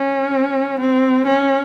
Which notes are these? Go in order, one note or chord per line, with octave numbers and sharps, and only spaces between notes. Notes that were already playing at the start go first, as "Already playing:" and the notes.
Already playing: C#4
C4
C#4